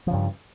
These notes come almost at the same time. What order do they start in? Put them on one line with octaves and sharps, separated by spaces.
F3 C#3 G2